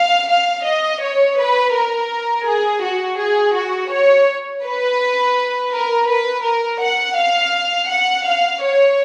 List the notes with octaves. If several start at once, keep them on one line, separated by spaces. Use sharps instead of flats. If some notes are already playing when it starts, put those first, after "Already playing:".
Already playing: F5
F5
D#5
C#5
B4
A#4
G#4
F#4
G#4
F#4
C#5
B4
A#4
B4
A#4
F#5
F5
F#5
F5
C#5